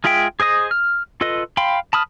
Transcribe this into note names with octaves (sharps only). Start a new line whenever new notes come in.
G#3 F4 G#4 E5 G5
G#4 C5 D#5 D#6
F6
F4 A4 B4 D#5
F5 G5 B5 C6
A5 B5 D#6 F6